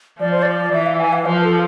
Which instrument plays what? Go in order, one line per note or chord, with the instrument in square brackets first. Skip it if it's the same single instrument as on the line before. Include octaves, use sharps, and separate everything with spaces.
[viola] F3 [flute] D5
[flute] C5
D5
[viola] E3 [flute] E5
[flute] F5
G#5
F5
[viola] F3 [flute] B4
[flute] A4